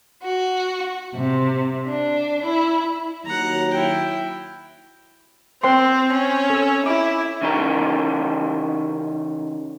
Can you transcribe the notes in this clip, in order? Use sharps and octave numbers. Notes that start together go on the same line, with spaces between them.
F#4
C3
D4
E4
D#2 F#3 F#5 A#5
E4 G5
C4 C5 G5 C6
C#4
A4 E6
E4 D6
C#3 E3 C#4 D#4 G4 A#4